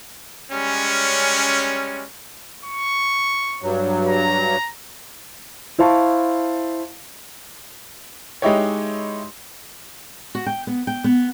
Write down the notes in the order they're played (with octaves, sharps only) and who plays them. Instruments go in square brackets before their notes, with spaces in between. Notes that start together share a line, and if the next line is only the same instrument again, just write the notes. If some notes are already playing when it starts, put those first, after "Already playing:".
[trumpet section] G3 G#3 C#4
[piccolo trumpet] C#6
[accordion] G2 F#3
[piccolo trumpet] A#5
[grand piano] E4 C5 F5 A5 C#6
G#3 D#4 E4 G4 C#5
[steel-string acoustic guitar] F#4
G5
B3
G5
B3